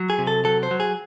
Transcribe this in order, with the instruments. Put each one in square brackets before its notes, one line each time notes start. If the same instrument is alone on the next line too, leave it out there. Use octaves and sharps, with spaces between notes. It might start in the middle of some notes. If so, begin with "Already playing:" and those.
Already playing: [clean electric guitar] F#3
G#4
C3
A4
F#3 A4
C5
F#3
G#4